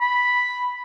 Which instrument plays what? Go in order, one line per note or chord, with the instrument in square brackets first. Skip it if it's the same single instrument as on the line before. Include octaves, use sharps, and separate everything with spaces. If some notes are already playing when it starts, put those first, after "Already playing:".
[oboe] B5